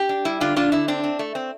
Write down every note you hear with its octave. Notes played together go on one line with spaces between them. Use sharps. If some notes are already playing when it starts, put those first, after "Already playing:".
Already playing: G4
D4
G3 E4
D3 D4 F4
D3 D4 F4
D3 E4
C4 D4
C4
A3
C4